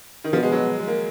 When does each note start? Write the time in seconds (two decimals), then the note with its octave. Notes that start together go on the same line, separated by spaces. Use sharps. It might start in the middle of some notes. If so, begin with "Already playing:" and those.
0.24 D#3
0.33 B2 F3
0.43 G#3
0.52 F#3
0.80 G#3
0.87 A#3